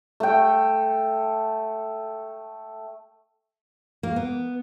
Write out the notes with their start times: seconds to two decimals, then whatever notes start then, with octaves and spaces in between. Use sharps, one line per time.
0.20 A3 G5
4.03 A#3
4.16 B3